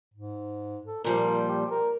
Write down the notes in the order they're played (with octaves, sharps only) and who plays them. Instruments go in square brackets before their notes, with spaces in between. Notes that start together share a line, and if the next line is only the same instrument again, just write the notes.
[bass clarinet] G#2
A4
[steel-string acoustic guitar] A#2 F3 G3 [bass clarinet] A#4
[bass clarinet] G4
A#4